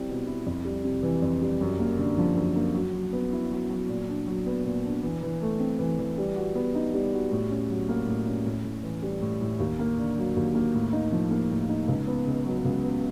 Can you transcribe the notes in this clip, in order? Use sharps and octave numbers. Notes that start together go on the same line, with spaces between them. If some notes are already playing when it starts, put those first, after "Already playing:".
Already playing: G3 C4 E4
B2
E4
F2
G3
C3
E3
F2
G3
F#2
A#3
D3
F3
F#2
A#3
F#3
F#3
B3
E4
F#3
F#3
A#2
D4
F#3
B3
A#2
D4
E3
E3
A3
C4
E3
E3
G3
F#4
B3
D#4
G3
F#4
A2
C#4
F#3
A#3
A2
C#4
A2
A2
E3
G3
A2
A2
D#2
A#3
D3
F#3
D#2
A#3
A2
D#4
F3
A#3
A2
D#4
C#2
B3
C#3
F#3
C#2
B3